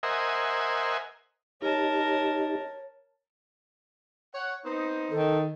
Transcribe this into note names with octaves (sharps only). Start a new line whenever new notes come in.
A#4 C5 D#5 E5 F#5 G#5
D#4 G4 A#4 C#5 D#5 A5
C#5 F#5
B3 C4 D#4
D#3 A4